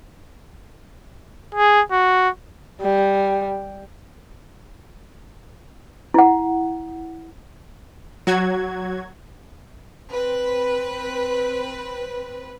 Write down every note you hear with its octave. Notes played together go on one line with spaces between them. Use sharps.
G#4
F#4
G3
E4 F#5
F#3 F#4 G#6
C4 B4